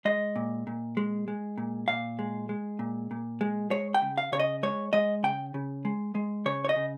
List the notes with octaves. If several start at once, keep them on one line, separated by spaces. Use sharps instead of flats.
G#3 D#5
A#2
A#2
G#3
G#3
A#2
A#2 F5
G#3
G#3
A#2
A#2
G#3
G#3 C#5
G5
C#3
F5
C#3 C#5
D#5
G#3 C#5
G#3 D#5
C#3 G5
C#3
G#3
G#3
C#3 C#5
C#5
D#5
C#3